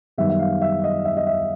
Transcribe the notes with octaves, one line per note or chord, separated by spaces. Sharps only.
F#2 D#3 G3 B3 E5
E5
F5
E5
D#5
E5
D#5
E5